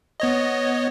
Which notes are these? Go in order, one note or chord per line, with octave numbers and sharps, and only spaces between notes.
B3 C#5 D#5